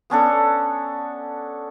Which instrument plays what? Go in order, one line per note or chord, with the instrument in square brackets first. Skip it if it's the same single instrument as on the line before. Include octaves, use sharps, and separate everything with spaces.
[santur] B3 C#4 D4 A4